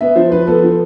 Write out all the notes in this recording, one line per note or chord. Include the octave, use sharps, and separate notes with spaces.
B3 E5
F3 C5
F3 B4
B3 A4
F3